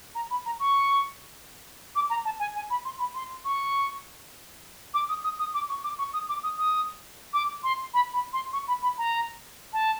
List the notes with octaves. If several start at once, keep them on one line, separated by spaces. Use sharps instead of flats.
A#5
B5
A#5
C#6
D6
A#5
A5
G#5
G#5
B5
C6
B5
C6
C#6
D6
D#6
D#6
D#6
D6
C#6
D6
C#6
D#6
D6
D#6
D#6
D6
C6
B5
B5
C6
C#6
B5
B5
A#5
A5